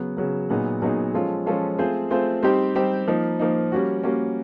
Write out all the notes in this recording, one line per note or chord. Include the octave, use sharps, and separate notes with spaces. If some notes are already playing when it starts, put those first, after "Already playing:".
Already playing: C#3 F#3 B3
C#3 F#3 B3
A#2 F#3 B3 D#4 G#4
A#2 F#3 B3 D#4 G#4
F3 G#3 C#4 F4 A4
F3 G#3 C#4 F4 A4
A3 C4 F4 G#4 C5
A3 C4 F4 G#4 C5
G3 C4 D#4 G4 C5
G3 C4 D#4 G4 C5
F3 A#3 D#4
F3 A#3 D#4
G3 A#3 C#4 F#4
G3 A#3 C#4 F#4